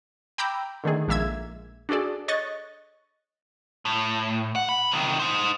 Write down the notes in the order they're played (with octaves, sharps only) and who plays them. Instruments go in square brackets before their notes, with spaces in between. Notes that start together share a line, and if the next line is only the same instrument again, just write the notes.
[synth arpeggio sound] G5 A#5 B5 D6 E6 G6
D3 D#3 A3 G#4
A#1 G#3 A#3 E5 E6 G#6
D4 F#4 G#4 A4 D5
C#5 D#5 C#6 F#6 A6
[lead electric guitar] A2
F#5
B5
C3 D#3
D#4 C5